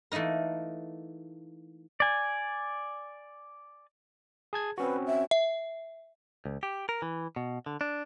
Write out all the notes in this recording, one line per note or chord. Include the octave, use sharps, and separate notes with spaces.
E3 A3 A#3 D#4 A#4
D5 G#5
G#4 A5 G#6
C4 C#4 F#4 B4
E5
E5
C#2
G4
A#4
E3
B2
D3
D4